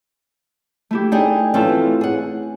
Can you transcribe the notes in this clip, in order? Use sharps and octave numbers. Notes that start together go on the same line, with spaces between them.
A3 E4 G4
D4 D#4 G#4 G5
E3 A3 C4 C#4 F4 A5
G#4 F#5